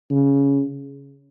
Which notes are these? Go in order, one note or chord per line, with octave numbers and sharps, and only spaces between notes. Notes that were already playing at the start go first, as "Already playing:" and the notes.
C#3